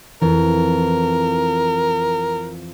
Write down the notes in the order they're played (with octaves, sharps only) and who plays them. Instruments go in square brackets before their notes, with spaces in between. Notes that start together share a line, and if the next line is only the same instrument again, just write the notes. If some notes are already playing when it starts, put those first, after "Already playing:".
[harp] F2 [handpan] E3 [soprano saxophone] A#4